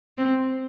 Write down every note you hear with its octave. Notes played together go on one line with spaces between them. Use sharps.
C4